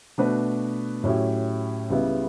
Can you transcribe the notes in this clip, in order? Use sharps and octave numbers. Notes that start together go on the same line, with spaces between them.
B2 A3 D4 F#4 B4
A2 F#3 C#4 E4 G4
C#2 C#3 G3 B3 E4